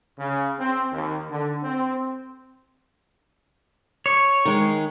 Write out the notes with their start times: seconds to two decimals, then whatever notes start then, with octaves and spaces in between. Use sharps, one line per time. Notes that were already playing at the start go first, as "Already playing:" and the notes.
0.18 C#3
0.59 C4
0.92 D#2
1.30 D3
1.63 C4
4.06 C#5
4.45 D#3 G#3